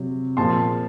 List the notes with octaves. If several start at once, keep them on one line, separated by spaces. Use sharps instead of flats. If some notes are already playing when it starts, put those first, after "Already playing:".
Already playing: C3 F#3
A#2 F3 A5 C6